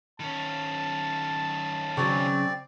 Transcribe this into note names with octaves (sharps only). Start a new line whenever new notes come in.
D#3 C#4 A5
C#3 F#3 C4 D5